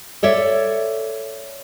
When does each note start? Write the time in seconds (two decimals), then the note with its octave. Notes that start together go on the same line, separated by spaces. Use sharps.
0.23 A4 C#5 D5 E5